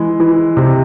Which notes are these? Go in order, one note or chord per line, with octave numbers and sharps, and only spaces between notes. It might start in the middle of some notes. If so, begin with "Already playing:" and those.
Already playing: E3 G#3
E3
C3